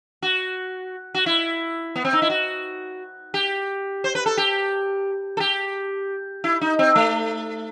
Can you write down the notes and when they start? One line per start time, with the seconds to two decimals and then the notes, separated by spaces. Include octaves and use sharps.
0.22 F#4
1.15 F#4
1.26 E4
1.96 B3
2.05 C4
2.13 D#4
2.22 E4
2.30 F#4
3.34 G4
4.04 C5
4.15 B4
4.26 A4
4.37 G4
5.37 A4
5.40 G4
6.44 E4
6.61 D#4
6.79 C4
6.96 A3